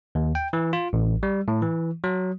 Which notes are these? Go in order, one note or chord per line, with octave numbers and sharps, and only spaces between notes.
D#2
G5
E3
F4
A1
G3
A2
E3
F#3